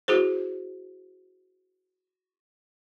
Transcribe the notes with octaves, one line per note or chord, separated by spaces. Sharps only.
E4 F#4 G#4 C5